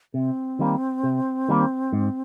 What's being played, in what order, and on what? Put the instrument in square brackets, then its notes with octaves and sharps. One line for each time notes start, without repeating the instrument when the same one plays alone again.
[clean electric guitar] C3 [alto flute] C4
[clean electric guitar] D#3 G3 A#3
C3
D#3 G3 A#3
G#2